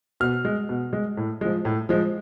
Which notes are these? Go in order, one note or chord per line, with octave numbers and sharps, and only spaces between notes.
B2 F6
G#3
B2
G#3
A2
F3 G#3
A2
F3 G#3